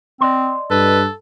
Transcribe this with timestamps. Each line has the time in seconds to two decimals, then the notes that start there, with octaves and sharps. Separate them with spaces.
0.21 C4 D5 D#5 C6
0.71 G2 A4 B4